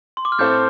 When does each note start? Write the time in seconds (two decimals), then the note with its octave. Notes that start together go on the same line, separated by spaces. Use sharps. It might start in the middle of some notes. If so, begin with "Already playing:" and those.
0.17 C6
0.25 D6
0.32 F6
0.39 A2 A3 C4 A4 C5 G6